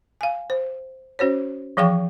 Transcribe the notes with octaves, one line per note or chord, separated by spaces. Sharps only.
F5 G#5
C5
C#4 F#4 C5 C#5
E3 F3 G#4 F5 G5 C#6